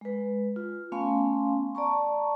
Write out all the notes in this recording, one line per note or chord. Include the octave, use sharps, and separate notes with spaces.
G#3 B4
F4
A3 B3 C#4 F5 G#5 C6
D5 A5 A#5 C#6